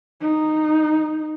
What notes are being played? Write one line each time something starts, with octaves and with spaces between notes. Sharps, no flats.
D#4